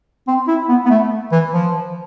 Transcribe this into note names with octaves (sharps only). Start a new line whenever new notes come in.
C4
E4
B3
B3
A3
E3
F3